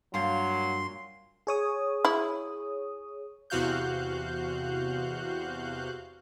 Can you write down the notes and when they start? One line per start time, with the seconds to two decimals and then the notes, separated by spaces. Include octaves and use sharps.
0.14 G2 A#2 F#3 A#4 F5 C6
1.47 G#4 C#5 D#6
2.05 E4
3.50 E2 C3 F#4 F5 F#6 G6